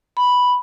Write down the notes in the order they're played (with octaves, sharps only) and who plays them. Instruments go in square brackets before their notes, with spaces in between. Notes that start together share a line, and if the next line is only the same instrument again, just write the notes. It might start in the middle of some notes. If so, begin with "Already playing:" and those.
[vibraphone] B5